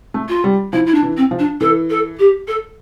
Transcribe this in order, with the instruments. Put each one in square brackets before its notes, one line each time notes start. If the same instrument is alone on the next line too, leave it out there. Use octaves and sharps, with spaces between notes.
[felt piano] A3
[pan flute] F4
[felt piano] G3
[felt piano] F3 [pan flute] E4
[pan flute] E4
D4
[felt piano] E3
[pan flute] C4
[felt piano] F3
[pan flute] D4
[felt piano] E3 [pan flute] A4
[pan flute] A4
G4
A4